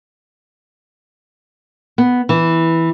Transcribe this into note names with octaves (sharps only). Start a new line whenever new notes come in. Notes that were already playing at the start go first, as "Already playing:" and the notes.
B3
E3